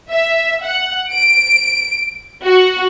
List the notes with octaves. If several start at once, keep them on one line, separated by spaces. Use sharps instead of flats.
E5
F#5
D7
F#4